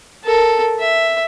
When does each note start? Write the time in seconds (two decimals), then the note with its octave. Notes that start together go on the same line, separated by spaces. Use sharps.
0.24 A4 A#4
0.80 E5